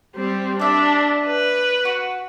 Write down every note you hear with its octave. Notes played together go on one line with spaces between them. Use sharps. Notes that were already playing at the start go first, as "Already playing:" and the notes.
G3 C4
D4 D5 E5
B4
F#4